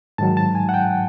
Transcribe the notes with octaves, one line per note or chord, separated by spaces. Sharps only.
G#2 D#3 F#3 A5
A5
G#5
F#5
G5